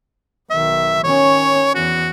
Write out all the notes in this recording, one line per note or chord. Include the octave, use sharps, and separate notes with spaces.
B1 D#3 E5
D#3 C#4 C#5
E2 F#4